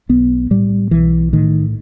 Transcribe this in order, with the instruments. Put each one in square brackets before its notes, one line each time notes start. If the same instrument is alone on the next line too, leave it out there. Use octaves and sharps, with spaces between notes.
[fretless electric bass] B1 B3
A2 G3
B1 E3
A2 D#3